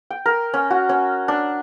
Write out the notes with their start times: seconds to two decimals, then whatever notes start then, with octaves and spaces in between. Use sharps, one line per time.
0.10 G5
0.26 A#4
0.54 C#4
0.70 F#4
0.89 C#4
1.28 D4